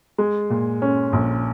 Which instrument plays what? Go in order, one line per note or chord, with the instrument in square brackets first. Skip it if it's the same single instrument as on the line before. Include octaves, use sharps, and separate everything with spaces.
[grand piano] G#3
A#2
C#4
A#1